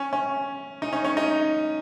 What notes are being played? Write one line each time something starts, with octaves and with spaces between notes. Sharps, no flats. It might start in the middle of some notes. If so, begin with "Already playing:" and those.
Already playing: C#4
C#4
D#4
C#4
C#4
D#4